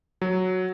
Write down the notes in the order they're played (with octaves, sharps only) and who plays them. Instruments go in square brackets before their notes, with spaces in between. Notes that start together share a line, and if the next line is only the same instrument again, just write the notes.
[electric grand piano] F#3